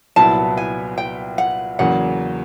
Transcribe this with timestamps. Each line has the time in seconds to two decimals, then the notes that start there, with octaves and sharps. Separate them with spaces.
0.16 C2 A#2 F#3 B3 E4 A5
0.57 G#5
0.98 G5
1.38 F#5
1.79 E2 C#3 F#3 A#3 F#5